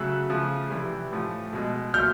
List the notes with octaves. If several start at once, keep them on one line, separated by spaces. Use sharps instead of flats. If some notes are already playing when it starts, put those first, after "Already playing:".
Already playing: C#3 F#3 A3 E6 F#6
C#3 F3 A3
C3 E3 G3
A2 F3 A3
B2 G#3
A#2 F#3 A3 F6 G6